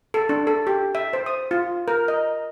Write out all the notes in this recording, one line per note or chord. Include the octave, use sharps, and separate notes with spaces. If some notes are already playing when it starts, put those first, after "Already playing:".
A4
D4
A4
G4
E5
C5
D#6
F4
A#4
D#5